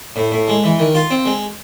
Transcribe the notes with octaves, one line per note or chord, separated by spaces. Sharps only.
A2
A2
G#3
E3
D#3
F4
C4
G#3